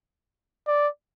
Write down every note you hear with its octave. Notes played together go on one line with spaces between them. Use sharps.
D5